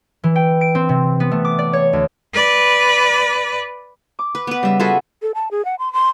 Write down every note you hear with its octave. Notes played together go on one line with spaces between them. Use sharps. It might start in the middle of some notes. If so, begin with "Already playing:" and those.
E3
G5
D7
C4
C3
B3
A3
D6
D5
C#5
D2
B4 D5
D6
B4
B3 B4
C#3 G3 E5
F4 F#4 G#4 A4 B4 E5
A4
A5
G#4
F#5
C6
C6